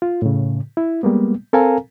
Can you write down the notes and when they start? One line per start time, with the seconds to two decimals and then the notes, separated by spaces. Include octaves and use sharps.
0.02 F4
0.22 A2 C#3
0.77 E4
1.03 G3 G#3 A#3 B3
1.53 C4 A4 A#4 F5 G#5 A#5